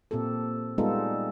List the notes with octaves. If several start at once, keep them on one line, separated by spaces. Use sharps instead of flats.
A#2 C4 G4 A4
G3 G#3 B3 D#4 F4 A4